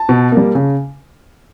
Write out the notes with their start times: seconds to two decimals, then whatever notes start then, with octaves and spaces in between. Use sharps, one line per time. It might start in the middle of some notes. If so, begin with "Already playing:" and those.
Already playing: A5
0.09 B2
0.32 G3 A#3
0.55 C#3